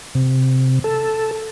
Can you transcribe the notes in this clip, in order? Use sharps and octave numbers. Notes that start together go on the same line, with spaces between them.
C3
A4